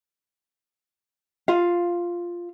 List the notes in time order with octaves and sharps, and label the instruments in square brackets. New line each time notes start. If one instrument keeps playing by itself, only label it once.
[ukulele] F4 F5